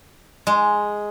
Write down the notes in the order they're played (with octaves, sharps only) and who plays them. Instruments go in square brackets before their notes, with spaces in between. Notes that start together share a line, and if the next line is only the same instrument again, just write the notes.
[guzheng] G#3